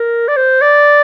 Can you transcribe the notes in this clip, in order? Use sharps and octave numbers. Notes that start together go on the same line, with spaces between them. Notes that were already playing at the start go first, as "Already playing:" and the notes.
Already playing: A#4
D5
C5
D5